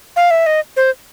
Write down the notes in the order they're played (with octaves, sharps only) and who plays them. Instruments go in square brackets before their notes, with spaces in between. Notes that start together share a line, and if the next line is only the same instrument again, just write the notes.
[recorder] F5
E5
D#5
C5